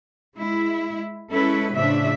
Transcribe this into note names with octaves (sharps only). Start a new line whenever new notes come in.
G#3 E4
G#3 C#4 E4 A4 B4
A2 C#3 F3 D4 E5